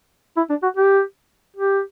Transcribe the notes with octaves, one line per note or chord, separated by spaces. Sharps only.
E4
D4
F#4
G4
G4